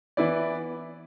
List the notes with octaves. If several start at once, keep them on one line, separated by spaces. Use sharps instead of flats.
E3 B3 E4 B4 D5